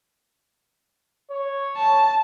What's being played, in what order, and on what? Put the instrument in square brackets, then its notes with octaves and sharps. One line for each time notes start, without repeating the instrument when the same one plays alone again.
[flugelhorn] C#5
[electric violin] A5